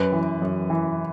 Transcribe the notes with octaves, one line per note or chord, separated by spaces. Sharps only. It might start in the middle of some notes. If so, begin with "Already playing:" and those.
Already playing: F#2 B4
E3
F#2
E3